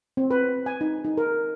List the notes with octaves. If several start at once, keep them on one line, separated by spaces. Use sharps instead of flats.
C4
B4
G#5
D#4
D#4
A#4